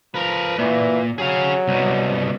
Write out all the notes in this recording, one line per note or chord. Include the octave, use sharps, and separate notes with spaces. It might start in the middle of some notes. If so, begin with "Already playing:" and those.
F3 A#4 B4
A#2 E3
F#3 G#4 F5
C2 B2